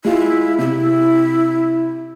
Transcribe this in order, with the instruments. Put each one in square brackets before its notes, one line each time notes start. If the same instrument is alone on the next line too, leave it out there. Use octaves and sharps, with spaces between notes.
[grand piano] G#3 F4 [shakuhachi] E4
[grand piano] C3 [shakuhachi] E4